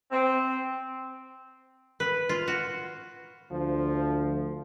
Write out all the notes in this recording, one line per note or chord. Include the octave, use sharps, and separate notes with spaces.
C4
B4
F4
F#4
D2 F3